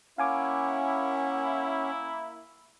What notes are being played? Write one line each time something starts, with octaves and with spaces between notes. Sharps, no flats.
A#3 C#4 E4 F5 F#5 G#5 D6